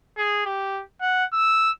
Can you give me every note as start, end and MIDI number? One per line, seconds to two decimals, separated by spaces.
0.17 0.42 68
0.45 0.82 67
1.01 1.24 78
1.33 1.71 88